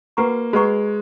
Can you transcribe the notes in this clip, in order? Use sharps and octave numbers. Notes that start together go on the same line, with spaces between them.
A#3 F#4 B4 F#5 A#5 C#6
G#3 F#4 B4 F#5 A#5 C#6